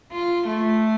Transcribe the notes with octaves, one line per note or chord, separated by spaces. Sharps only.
F4
A3